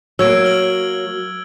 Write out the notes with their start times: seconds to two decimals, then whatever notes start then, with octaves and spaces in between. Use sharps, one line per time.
0.19 F#3 A#3 E6 G#6 D7
0.44 F6 F#7